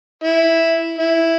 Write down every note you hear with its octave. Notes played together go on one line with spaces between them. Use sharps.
E4
E4